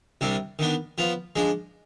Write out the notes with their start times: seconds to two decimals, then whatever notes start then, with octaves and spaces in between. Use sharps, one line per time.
0.21 C2 C3 G3 D4
0.59 D#3 B3 D4
0.98 F3 B3 F4
1.36 F3 G#3 D4